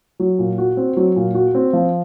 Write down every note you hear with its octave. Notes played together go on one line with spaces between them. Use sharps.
F#3
A#2
F#4
C4
F#3
A#2
F#4
C4
F3